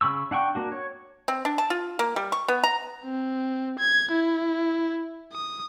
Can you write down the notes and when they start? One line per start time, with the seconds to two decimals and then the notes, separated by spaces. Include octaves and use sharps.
0.01 C#3 B5 C#6 E6
0.31 D4 F#5 G5 C#6
0.55 A#3 D4 F#4
0.72 C#5
1.28 C4
1.45 D4
1.58 A5
1.70 F4
1.99 A#3
2.16 G3
2.32 C#6
2.48 B3
2.64 A#5
3.05 C4
3.79 G#6
4.12 E4
5.33 D#6